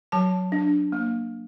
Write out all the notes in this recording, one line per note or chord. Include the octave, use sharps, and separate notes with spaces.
F#3 A5
D4
A#3